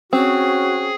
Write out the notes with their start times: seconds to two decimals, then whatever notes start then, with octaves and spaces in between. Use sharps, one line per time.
0.13 C4 C#4 F#4 G#4